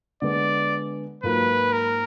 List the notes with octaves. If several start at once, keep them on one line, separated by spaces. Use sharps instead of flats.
D3 G#3 B3 D5
G#2 F#3 A#3 F4 B4
A#4